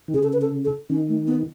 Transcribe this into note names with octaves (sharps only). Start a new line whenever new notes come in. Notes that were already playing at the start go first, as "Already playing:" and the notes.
D#3
C#3 G#4
A4
B4
A4
A4
D#3 C#4
A3
B3